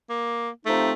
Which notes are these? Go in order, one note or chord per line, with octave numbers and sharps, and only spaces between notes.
A#3
C3 F3 A3 C4 D#4